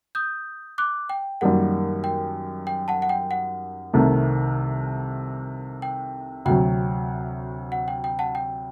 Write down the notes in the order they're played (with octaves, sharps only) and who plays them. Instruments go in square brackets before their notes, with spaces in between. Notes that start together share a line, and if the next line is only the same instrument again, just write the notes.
[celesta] D#6 G6
D6 F#6
G5
[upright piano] F#2 D#3 G3 A#3 [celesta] F#5
[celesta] G5
G5
F#5 A5
F#5
G5
F#5
[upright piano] C2 C3 D#3 A3
[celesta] G5
[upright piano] D2 C3 F#3 [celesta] G5
[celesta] F#5
G5
G5
F#5 A5
G5